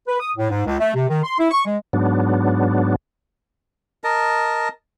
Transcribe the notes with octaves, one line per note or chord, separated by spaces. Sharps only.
B4
D#6
A2
G#2
C#2
A3
C3
D#3
C6
E4
C#6
G#3
G#2 F#3 B3 D4
A#4 D#5 A5